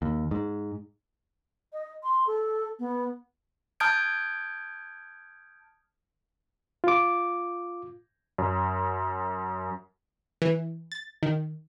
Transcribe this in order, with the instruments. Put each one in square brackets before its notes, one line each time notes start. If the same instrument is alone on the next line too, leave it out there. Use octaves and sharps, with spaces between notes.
[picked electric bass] D#2
G#2
[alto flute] D#5
C6
A4
B3
[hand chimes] A5 D#6 F6 G6 G#6 D7
[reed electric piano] F4 D6
[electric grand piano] F#2
[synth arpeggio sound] E3
A6
D#3